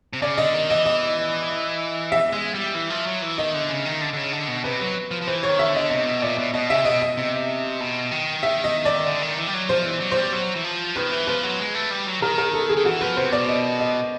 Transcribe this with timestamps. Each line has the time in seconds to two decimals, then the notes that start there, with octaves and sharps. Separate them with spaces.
0.13 C3
0.22 C#3 D5
0.38 D3 D#5
0.54 D#3
0.70 E3 D#5
0.86 D#5
2.12 E5
2.33 G#3
2.54 G3
2.75 E3
2.90 F3
3.07 F#3
3.22 E3
3.38 D#3 D#5
3.54 D3
3.70 C#3
3.85 D#3
4.01 D3
4.13 D3
4.16 C#3
4.33 D3
4.48 B2
4.64 C3 B4
4.80 F#3
5.11 F3
5.21 F3
5.27 E3 C5
5.43 C#5
5.49 D#3
5.59 E5
5.69 D3
5.75 D#5
5.90 C3 D#5
6.06 B2
6.22 A#2 D5
6.38 B2
6.54 B2 D#5
6.70 C#3 E5
6.81 C3
6.85 B2 D#5
7.02 D#5
7.17 C3
7.80 B2
8.11 D#3
8.43 E5
8.64 D#5
8.85 D5
9.07 D3
9.22 D#3
9.38 E3
9.47 G3
9.54 F#3
9.69 F3 C5
9.85 E3
10.00 F#3
10.11 C5
10.17 G3
10.33 F#3
10.55 E3
10.64 F3
10.96 D#3 B4
11.11 E3
11.27 F3 B4
11.43 F#3
11.59 G#3
11.75 A3
11.91 G3
12.06 F#3
12.22 D#3 A#4
12.38 A#4
12.54 A4
12.69 G#4
12.77 D#3
12.85 E3 F#4
13.01 F3 B4
13.17 C3 C5
13.32 B2 D5
13.49 D#5
13.80 D#5